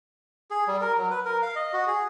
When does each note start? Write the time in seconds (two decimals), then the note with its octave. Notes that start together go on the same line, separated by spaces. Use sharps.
0.51 G#4
0.68 G3
0.81 A#4
0.98 F#3
1.11 B4
1.25 A#4
1.42 F5
1.56 D#5
1.73 F#4
1.87 G#4